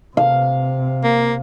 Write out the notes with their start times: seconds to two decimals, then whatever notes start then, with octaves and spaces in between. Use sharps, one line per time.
0.17 C3 F5
1.04 A#3